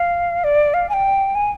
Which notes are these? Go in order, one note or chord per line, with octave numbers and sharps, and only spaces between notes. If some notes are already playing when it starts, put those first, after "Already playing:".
Already playing: F5
D5
F5
G#5
G5
G#5